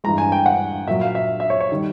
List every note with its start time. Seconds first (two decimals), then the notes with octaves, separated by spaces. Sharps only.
0.04 G2 E3 G#3 A#5
0.18 G#5
0.32 G5
0.46 F#5
0.87 A#2 E5
0.90 F#3
1.01 F5
1.15 E5
1.40 E5
1.50 C#5
1.61 C#5
1.72 D#3 G3